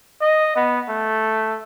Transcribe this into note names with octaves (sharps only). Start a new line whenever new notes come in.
D#5
B3
A3